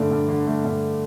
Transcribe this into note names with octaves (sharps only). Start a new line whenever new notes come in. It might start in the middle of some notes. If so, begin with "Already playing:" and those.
Already playing: G2 D3 A3 D5
G2
D3
A3
G2